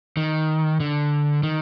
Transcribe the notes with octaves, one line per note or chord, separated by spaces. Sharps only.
D#3
D3
D#3